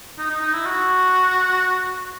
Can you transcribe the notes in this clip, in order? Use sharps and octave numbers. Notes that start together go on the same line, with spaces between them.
D#4
D#4
D#4
E4
F#4